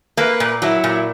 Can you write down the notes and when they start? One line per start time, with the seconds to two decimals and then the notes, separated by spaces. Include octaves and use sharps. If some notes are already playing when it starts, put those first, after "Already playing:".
0.17 A#3 B4
0.40 A#2
0.62 F#3 E4
0.84 A#2